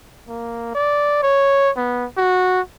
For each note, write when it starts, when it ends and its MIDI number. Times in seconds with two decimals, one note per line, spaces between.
0.28 0.74 58
0.75 1.23 74
1.23 1.71 73
1.77 2.06 59
2.17 2.60 66